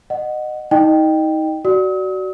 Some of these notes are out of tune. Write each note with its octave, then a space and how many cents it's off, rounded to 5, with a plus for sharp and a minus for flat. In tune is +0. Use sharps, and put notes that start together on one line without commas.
D#5 -20 F#5 +0
D#4 +30 D#5 -25 G5 +0
F#4 +20 D5 +0 D#6 +45